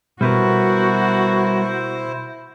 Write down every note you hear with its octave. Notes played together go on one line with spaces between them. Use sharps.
B2 G3 B3 E4 F#4 A#4 C5